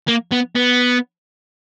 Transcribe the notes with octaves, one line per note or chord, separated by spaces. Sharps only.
A#3
B3
B3